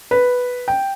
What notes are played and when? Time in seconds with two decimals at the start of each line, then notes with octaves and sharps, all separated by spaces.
0.11 B4
0.68 G5